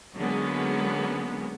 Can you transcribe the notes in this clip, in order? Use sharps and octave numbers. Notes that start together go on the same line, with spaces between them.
D3 F#3 G#3 A#3 B3 C#4